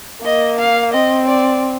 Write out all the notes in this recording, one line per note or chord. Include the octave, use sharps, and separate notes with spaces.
A#3 D#5
F5
C4 D#5
D5